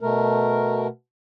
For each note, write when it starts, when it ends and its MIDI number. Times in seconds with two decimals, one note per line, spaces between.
0.01 0.87 47
0.01 0.87 57
0.01 0.87 70